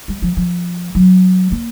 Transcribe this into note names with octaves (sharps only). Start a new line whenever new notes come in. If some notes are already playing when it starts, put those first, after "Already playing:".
G3
F3
F3
F#3
A#3